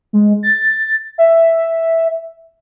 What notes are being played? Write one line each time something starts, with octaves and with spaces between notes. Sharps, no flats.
G#3
A6
E5